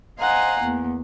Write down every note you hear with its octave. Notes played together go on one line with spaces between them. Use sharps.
C5 D#5 F5 F#5 G#5 A#5
E2 A#3